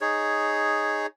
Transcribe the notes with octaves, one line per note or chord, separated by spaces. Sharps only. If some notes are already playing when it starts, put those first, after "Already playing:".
D#4 G#4 C#5